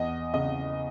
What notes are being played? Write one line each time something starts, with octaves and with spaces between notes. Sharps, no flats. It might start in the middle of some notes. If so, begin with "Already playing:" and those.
Already playing: E2 D#5
C#3 D#5